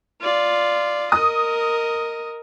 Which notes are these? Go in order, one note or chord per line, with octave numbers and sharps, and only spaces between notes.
F4 D5
A#4 D#5 D#6